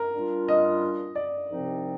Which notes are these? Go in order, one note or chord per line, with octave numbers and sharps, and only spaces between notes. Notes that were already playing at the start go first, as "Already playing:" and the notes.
Already playing: A#4
A#2 G3 D4 F4
D#5
D5
C2 C3 F3 C4 D#4